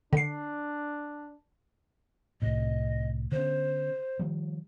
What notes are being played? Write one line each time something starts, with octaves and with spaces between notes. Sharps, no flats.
D3 D4 C7
C2 A2 D#5
D3 B3 C#4 C5
D#3 F3 G3